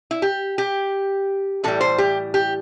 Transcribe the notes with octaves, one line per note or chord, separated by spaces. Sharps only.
E4
G4
G4
A2 E3 G3 A4
C5
G4
G4